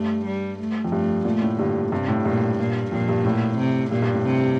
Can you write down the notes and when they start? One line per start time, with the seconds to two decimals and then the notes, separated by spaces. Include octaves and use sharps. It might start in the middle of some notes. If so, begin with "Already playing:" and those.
Already playing: G2 A3
0.25 G3
0.59 A3
0.85 F2
0.92 G2 A3
1.25 A#2 A3
1.42 A2
1.59 G2 D3
1.92 G2 C3
2.08 A2
2.25 G2 A#2
2.59 A#2
2.92 F2 A#2
3.09 G2
3.25 A2
3.58 C3
3.91 G2 A#2
4.02 G2
4.14 A2
4.25 C3